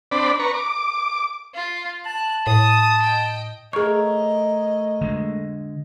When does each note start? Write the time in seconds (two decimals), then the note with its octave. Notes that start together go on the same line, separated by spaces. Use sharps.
0.11 C4 D4 D5 B5
0.39 B4 A#5 C#6
0.54 D6
1.54 F4
2.06 A5 F#6
2.47 A2 D#6
3.03 D#5 G5
3.73 A3 G#4 A#4 C#5 D#5 C#6
5.01 D3 G#3